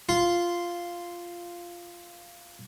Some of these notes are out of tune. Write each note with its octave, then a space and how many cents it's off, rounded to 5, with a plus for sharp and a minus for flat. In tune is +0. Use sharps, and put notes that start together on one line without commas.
F4 -5